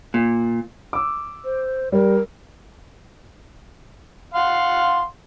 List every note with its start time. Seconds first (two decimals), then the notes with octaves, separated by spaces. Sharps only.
0.14 A#2
0.93 D6 E6
1.45 C5
1.92 G3 A#4
4.34 F5 F#5 C6